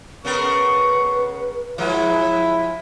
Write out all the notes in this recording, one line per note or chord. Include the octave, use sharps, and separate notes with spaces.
C#3 B3 A#4 B4 C#6
F3 G#3 E4